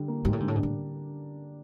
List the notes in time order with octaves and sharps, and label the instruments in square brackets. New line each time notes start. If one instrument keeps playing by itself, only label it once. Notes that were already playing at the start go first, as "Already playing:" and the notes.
Already playing: [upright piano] D3 G3 D4
A#3
[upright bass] G#2 [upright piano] G3
[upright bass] A2
[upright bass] G#2 [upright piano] D3
[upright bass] A2
[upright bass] G#2 [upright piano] D4
[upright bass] A2